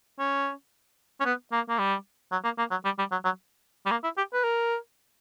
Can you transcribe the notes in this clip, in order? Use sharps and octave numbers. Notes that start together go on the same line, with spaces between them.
C#4
C#4
B3
A#3
A#3
G3
F#3
A#3
A#3
F#3
G3
G3
F#3
F#3
G3
A#3
E4
G4
B4
A#4